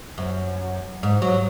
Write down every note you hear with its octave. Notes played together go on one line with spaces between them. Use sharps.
F#2
G#2
F#3